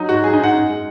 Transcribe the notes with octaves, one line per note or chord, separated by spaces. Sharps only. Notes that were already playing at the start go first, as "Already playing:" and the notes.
Already playing: F#3 D#4
G#2 F#4
F#3 G#4
D#4
G#2 F#5
F#2
G#3